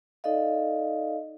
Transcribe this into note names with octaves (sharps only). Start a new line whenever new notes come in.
D#4 A4 D5 D#5 F5